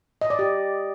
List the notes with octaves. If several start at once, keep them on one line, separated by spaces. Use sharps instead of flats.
D#5
D5
G4